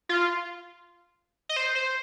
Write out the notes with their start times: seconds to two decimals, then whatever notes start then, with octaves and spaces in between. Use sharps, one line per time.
0.09 F4
1.49 D#5
1.56 C5
1.75 C5